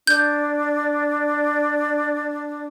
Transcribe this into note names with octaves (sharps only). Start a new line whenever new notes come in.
D4 G6